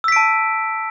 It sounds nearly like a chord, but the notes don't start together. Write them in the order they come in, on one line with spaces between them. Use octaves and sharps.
E6 B6 D7 A5